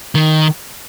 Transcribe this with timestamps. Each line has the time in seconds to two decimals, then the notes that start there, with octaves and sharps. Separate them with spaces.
0.15 D#3